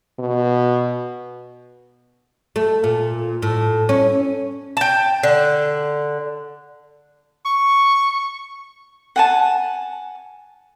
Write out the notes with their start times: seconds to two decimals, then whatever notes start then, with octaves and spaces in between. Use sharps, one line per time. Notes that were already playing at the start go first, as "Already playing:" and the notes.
0.19 B2
2.56 A3
2.84 A#2
3.42 A2
3.89 C#4
4.77 G5 A5
5.23 D3
7.46 C#6
9.16 F#5 G#5 A5